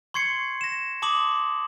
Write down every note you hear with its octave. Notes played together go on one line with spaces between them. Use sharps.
C6 C#6 G#6 C7 C#7
A#6 E7
A5 C6 D6 D#6 F#7